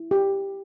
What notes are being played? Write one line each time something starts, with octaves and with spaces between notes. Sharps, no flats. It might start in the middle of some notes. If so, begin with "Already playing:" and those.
Already playing: E4
G4